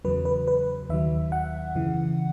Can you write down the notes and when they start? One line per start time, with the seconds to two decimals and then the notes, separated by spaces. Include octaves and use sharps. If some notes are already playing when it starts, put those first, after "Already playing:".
0.05 E2 C#3 F#3 B4
0.25 B4
0.48 B4
0.90 D#2 D#3 F#3 E5
1.32 F#5
1.75 F#2 C#3 E3